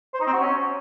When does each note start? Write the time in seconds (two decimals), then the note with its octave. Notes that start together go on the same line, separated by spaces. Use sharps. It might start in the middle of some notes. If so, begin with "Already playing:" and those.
0.14 C5
0.20 D#4
0.27 C4
0.33 F#4
0.39 C#4